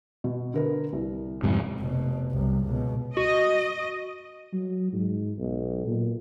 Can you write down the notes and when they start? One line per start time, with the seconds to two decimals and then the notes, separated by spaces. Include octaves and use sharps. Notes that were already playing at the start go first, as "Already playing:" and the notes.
0.24 B2
0.54 D3 A#4 B4
0.93 C2
1.43 F2 G#2 C3
1.79 F1 B2
2.32 C2 F#2
2.65 C#2 B2
3.17 F#4 D#5
4.53 F#3
4.93 G#2
5.39 B1
5.87 A#2